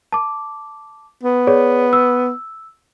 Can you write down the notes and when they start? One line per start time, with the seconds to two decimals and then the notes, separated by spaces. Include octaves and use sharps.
0.12 A5 D6
1.23 B3
1.47 G#4 C#5 D5
1.93 E6